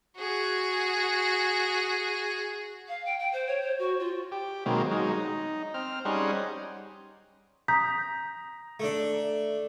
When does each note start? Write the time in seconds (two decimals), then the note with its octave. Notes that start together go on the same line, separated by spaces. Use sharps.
0.17 F#4 G#4
2.88 F5
3.05 G5
3.19 G5
3.32 C5
3.47 C#5
3.61 C5
3.79 F#4
3.99 F4
4.32 G4
4.66 B2 D#3 F#3 G#3 A#3 C4
4.91 F#3 G#3 D#4
5.13 D#4
5.74 C4 F6
6.05 G3 C#4 D#4 G#4 C5 F#5
7.68 A#5 D#6 G6 B6
8.80 A3 D4